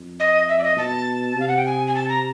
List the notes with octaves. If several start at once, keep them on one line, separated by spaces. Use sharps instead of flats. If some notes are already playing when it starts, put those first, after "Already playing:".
Already playing: F2
D#5
E5
D5
D#5
B2 A5
C3 F5
F#5
G5
G#5
G#5
A5
A#5